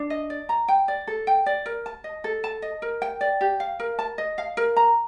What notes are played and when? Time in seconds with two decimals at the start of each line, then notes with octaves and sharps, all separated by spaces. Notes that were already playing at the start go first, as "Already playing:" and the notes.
Already playing: D4
0.10 D#5
0.30 D5
0.49 A#5
0.68 G5
0.88 D5
1.07 A4
1.27 G5
1.46 D5
1.66 A#4
1.86 A5
2.04 D#5
2.24 A4
2.44 A5
2.62 D#5
2.82 A#4
3.02 G5
3.21 D5
3.41 G4
3.60 F5
3.80 A#4
3.99 A5
4.18 D#5
4.38 F5
4.57 A#4
4.77 A#5